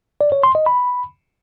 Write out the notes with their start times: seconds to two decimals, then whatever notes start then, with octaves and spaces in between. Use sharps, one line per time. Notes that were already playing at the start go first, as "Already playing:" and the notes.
0.21 D5
0.32 C#5
0.43 C6
0.55 D#5
0.66 B5